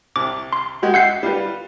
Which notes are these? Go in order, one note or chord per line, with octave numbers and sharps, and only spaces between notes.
C2 D6
C6
G#3 F#4 G4
E5 F#5 G6 C7
G3 F4 B4